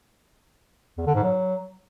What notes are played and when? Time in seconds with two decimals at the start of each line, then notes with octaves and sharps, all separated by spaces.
0.98 E2
1.06 D3
1.15 G#2
1.23 F#3